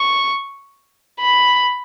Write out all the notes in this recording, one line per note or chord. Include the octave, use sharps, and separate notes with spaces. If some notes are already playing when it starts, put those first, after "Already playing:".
Already playing: C#6
B5